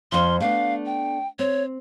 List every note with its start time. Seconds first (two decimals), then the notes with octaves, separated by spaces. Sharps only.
0.12 F2 F3 C6
0.40 A3 B3 D4 F5
0.86 G5
1.39 C4 C#5